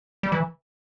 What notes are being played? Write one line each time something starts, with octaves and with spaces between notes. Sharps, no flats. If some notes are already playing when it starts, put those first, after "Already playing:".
G3
E3